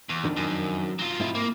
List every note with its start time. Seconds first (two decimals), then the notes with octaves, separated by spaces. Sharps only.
0.09 E2
0.25 F2 D#3 D4
0.37 F#2
0.99 F#3 F4
1.20 G#2 C4 E4
1.35 A#3